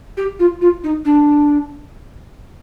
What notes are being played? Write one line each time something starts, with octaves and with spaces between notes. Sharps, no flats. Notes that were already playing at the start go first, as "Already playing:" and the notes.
G4
F4
F4
D#4
D4